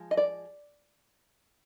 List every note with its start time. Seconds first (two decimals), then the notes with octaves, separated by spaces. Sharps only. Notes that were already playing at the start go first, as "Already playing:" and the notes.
Already playing: F3 G#3
0.11 D#5
0.17 D5